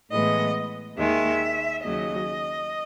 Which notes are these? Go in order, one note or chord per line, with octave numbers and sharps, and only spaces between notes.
A2 E3 G#3 B3 D#5
D#2 D#3 G#3 E5
D#2 C#3 F#3 D#5